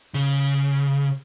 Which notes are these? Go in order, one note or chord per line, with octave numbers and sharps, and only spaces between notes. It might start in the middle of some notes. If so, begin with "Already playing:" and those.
C#3